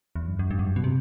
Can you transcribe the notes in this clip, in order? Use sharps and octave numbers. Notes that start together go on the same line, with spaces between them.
E2
F#2
F#2
G2
F#2
G2
B2
C3